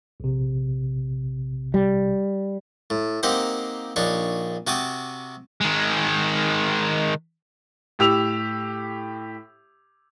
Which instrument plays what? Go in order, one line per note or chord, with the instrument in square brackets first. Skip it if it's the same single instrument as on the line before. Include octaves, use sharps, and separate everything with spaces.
[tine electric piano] A#1 C3
[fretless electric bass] G3
[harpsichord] A2
A#3 C4 D#4 G4 C5 F#5
A#1 D4 D#4 C#5
C3 F#4 G5 A5 D6 D#6
[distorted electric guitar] D#3 G#3
[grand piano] A2 G4 E6 F7